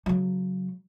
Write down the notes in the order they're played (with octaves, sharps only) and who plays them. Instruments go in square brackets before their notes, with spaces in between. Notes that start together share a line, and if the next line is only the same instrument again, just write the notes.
[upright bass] C#3 F#3